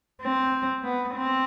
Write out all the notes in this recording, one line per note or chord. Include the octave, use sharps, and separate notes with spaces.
C4
B3
C4